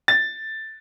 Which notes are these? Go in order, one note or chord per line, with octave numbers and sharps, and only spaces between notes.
A6